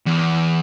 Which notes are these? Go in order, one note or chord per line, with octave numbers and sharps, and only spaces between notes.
E2